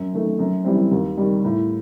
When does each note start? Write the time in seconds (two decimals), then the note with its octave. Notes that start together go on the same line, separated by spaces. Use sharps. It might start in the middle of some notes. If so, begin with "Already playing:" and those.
Already playing: F#2
0.13 D#3 A3
0.39 F#2
0.65 E3 G3 C4
0.91 D#2
1.17 D#3 G3
1.45 A2